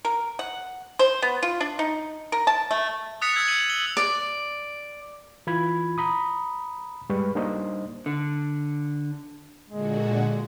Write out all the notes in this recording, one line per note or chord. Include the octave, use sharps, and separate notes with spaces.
A#4
F#5
C5
B3
F4
D4
D#4
A#4
A5
A3
D#6 F#6 A6 B6 C#7 F7
E6 G#6
C#7 D#7 F#7
F#7 G7
D5
E3 F4 B5 G#6
A#5 B5 D#6
G2 G3 G#3 B4 C#6
G3 A#3 D4 D#4 C5 D#5
D3
A#2 D3 G#3 F#4